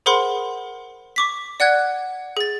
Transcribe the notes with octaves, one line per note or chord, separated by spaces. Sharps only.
G#4 A#4 C5 F#5 B5 C6
C#6 D6 B6
D5 F#5 F#6 G#6
G#4 A6